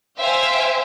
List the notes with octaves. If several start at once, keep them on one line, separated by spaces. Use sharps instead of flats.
C5 E5 F5 G5 G#5